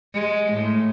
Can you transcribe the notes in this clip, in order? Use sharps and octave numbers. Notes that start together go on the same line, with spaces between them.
G#3
A2